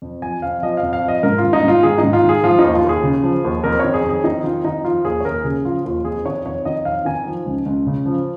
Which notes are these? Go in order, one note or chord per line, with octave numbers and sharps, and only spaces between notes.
F2
F3 G#5
F2 F5
F3 D#5
F5
F2
F5
F3
D#5
G#2 A#4
F4
D#3
D#4
G#2
F4
D#3 G#4
D#4
G#2
F4
D#3
G#4
F3 F4
D#4
D#2
F4
D#2
G#4
C#3
F3
D#2
F2 A#4
D#3 C#5
G#4
F2
G#4
D#3 D#4
F2 F4
D#3 D#4
F3 F4
D#2 G#4
C#5
D#2 A#4
C#3 G#4
F3 F4
D#2 F4
F2 G#4
D#3 C#5
F2 C#5
D#3 D#5
F2 F5
D#3 G#5
F3
C#2
C#2
C#3
F3